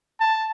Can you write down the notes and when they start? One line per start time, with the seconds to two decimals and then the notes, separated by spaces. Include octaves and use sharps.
0.20 A5